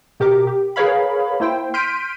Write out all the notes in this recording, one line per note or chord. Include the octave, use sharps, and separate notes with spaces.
B2 G4 A#4 D6
G4
G#4 A#4 B4 C#5 F5 B5
A#3 E4 C5 G5
C6 F6 G6 B6 D7 D#7